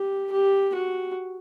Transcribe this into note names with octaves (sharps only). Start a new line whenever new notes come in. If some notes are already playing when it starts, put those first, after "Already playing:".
Already playing: G4
G4
F#4